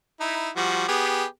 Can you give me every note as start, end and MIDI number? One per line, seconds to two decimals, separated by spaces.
0.20 0.50 63
0.20 0.50 64
0.57 0.87 53
0.57 0.87 55
0.57 0.87 66
0.88 1.24 59
0.88 1.24 67
0.88 1.24 68